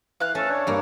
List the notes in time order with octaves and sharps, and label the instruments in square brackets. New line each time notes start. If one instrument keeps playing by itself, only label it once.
[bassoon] E3 [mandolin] F5 F#6
[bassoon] A3 [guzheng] C#4 [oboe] A4
[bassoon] D4 [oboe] C#5
[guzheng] G2 A#3